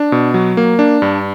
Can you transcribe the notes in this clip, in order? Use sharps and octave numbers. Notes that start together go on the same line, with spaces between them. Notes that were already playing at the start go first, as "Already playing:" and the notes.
Already playing: D4
B2
F#3
A#3
D4
G2